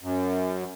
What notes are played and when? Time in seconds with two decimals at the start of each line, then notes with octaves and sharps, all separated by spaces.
0.03 F#2